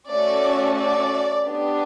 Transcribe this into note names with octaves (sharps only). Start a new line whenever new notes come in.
A3 C#4 F#4 A4 D5
D5
B3 D4 G4